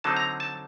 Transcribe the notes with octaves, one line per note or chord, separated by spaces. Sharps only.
D3 F#3 C4 D#4 A5
A#5
A5